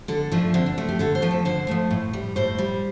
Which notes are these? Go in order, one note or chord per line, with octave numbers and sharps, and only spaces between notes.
D3 A4
F3 A3 D4
D3 C4
D4
F3 A3
G4
D3 A4
C5
F3 A3
A4
D3 C5
F3 A3
A2
G3
A2 C5
G3